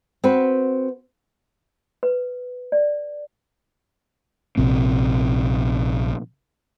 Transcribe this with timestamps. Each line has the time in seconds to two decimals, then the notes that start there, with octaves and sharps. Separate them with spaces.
0.24 C4 F#4 B4
2.03 B4
2.72 D5
4.57 A#1 C3 C4